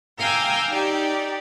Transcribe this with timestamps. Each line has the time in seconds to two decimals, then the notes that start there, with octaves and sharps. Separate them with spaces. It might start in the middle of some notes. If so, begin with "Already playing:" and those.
0.18 F5 G5 G#5 A#5 D6 E6
0.70 D#4 G4 D5